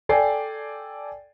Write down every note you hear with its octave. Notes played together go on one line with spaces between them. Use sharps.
A4 D5 G5 G#5 C7